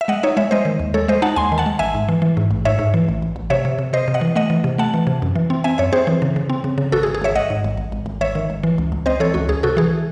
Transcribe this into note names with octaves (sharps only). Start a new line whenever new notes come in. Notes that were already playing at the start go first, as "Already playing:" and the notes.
E5
G#3 D#5 F#5
D#4 C#5 E5
G#3 C#5 E5
G#3 C5 D#5
D#3
D#2
G#3 A4 C#5
G#3 C5 D#5
D#4 F#5 A5
D#2 G#5 C6
D#3
F#5 A5
G#3
A1 E5 G#5
G#2
E3
E3
G#2
A1
G#2 C#5 E5
G#2
E3
A1
A1
A1
C3 C#5 E5
C3
C3
C3 C5 D#5
C3
D#5 F#5
E3
A3 D#5 F#5
E3
C3
A3 F#5 A5
E3
C3
F#2
E3
C4
C4 E5 G#5
F#2 C#5 E5
C4 G#4 C5
E3
C#3
C#3
C4
C#3
C#3
G#1 F#4 A4
G#4
G#1
G#4
G#1 C#5 E5
G#1 D#5 F#5
G#2
G#1
G#1
G#1
G#1
G#1 C#5 E5
D#3
G#1
E3
C#2
C#2
C4 C5 D#5
E3 A4 C#5
C#2 F#4
C#2 G#4
C3 F#4 A4
E3 G#4